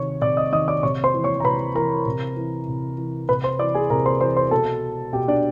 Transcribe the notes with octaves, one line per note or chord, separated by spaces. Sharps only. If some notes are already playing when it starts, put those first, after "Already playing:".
Already playing: C3 D#3 C#5 C#6
C3 D5 D6
D#5 D#6
D#3 D#5 D#6
D5 D6
C3 C#5 C#6
C5 C6
E3
C#5 C#6
A#5
C3 B4 B5
E3 A#4 A#5
C3
E3
C3
E3
C3 B4 B5
C5 C6
E3 D5 D6
G#4 G#5
C3 A#4 A#5
C5 C6
E3 C5 C6
C5 C6
B2 A4 A5
B2 G4 G5
D4 D5